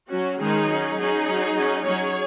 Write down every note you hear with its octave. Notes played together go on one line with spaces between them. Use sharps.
F#3 C#4 F#4
D#3 G#3 C#4 D#4 G#4
F#3 C#4
F#3 C#4 D#4 G#4
F#3 C#4
F#3 C#4
F#3 C#4 G#4 C#5